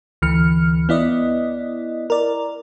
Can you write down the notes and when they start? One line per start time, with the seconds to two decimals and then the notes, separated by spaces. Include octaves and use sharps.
0.22 D2 E3 F6 C#7
0.89 B3 E4 D5 D#5
2.10 A#4 D5